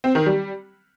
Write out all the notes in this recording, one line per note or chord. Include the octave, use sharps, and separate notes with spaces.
C4
D#3
G3